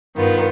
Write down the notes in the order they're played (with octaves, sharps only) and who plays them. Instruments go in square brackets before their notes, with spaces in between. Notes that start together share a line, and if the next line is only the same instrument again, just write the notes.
[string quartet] G2 D#3 B3 F4